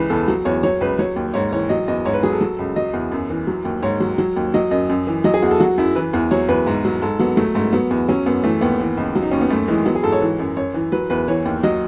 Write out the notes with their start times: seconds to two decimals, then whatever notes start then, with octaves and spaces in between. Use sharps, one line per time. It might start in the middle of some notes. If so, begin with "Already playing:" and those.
Already playing: C#2 E3 B4
0.10 E2 A4
0.28 F#3
0.45 E2 C#5
0.63 F#3 C#5
0.81 C#2 B4
0.99 F#3 C#5
1.16 D#2
1.34 G#2 C#5
1.52 E3 C#5
1.69 F#3 D#5
1.88 E2 D#5
2.05 G#2 C#5
2.14 B4
2.23 F#3 G#4
2.32 A4
2.41 F#3
2.59 C#2
2.76 F#3 D#5
2.93 E2
3.12 F#2
3.30 E3
3.47 F#3
3.65 D#2
3.83 G#2 C#5
4.00 F#3
4.18 F#3
4.36 D#2
4.54 F#3 D#5
4.71 F#2 D#5
4.90 F#2
5.07 E3
5.24 F#3 D#5
5.34 G#4
5.42 E2 F#4
5.51 A4
5.60 F#3 F#4
5.78 F#2 E4
5.95 E3 B4
6.13 E2
6.31 F#3 C#5
6.48 E2 B4
6.67 G#2
6.85 F#3
7.02 G#2 A4
7.19 F#3 B3
7.37 F#3 A3
7.55 G#2 A3
7.73 F#3 B3
7.91 E2
8.09 F#3 C#4
8.26 F#2 B3
8.44 E3 A3
8.61 D#2 B3
8.80 E3
8.97 C#2
9.15 F#3
9.22 D#4
9.31 D#2 C#4
9.41 B3
9.50 F#2 A3
9.68 E3 G#3
9.85 F#3 B3
9.95 G#4
10.03 G#2 A4
10.12 C#5
10.21 E3
10.39 F#2
10.57 F#2 C#5
10.74 E3
10.92 F#3 B4
11.10 E2 B4
11.28 E3 C#5
11.45 D#2
11.63 F#3 D#5